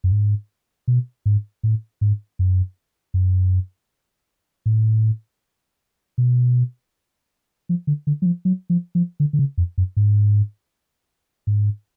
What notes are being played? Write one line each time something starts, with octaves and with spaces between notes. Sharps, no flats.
F#2
G#2
B2
G#2
A2
G#2
F#2
F#2
A2
B2
F3
D3
D3
F#3
F3
F#3
F3
F3
D3
D3
C#3
F2
F#2
G#2
G#2